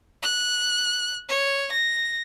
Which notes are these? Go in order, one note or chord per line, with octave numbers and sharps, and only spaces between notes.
F#6
C#5
A#6